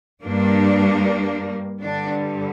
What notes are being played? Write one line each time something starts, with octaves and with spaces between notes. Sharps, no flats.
G2 G3 A#3 D4
G2 D3 G3 D4